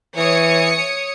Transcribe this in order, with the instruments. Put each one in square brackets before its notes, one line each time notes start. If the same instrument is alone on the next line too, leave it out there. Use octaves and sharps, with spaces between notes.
[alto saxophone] E3 [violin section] C#5 D#6 C#7